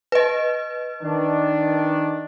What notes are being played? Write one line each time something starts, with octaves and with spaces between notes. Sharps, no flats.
B4 D#5
D#3 D4